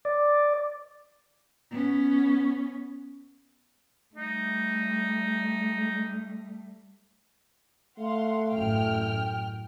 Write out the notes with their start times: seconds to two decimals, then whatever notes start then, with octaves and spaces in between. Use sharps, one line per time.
0.05 D5
1.71 B3 C#4
4.15 G3 A3 D#4
7.99 A3 F5 F#5 C6
8.52 A1 F#2 G5 F6